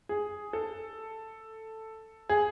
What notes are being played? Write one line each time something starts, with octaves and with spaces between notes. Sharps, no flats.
G#4
A4
G#4